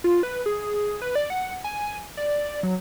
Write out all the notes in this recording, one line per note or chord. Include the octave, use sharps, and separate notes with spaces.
F4
B4
G#4
B4
D5
F#5
G#5
D5
D5
F#3